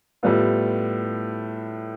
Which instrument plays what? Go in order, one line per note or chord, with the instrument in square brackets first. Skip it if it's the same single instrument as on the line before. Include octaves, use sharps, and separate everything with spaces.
[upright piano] A2 G3 B3 F4